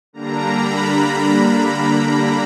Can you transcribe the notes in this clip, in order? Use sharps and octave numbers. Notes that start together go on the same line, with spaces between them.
D3 G3 A#3 D4 A#5
B5